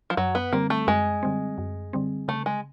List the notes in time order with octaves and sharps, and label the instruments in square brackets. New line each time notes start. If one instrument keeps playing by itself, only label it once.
[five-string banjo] F3
[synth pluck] F#2 [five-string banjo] F#3
[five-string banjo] B3
[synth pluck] D3 G3 C4 [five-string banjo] A#3
[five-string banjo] A3
[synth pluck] F#2 [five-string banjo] G#3
[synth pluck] D3 G3 C4
F#2
D3 G3 C4
[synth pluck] C#3 [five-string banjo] A3
[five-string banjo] G#3